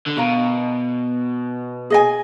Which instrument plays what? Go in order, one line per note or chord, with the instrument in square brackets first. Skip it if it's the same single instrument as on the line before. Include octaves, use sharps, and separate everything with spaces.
[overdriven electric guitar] D3
[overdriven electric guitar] B2 [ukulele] A#4 F5 A#5
[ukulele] G#4 D#5 G#5